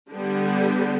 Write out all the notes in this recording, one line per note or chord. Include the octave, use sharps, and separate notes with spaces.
D3 G3 B3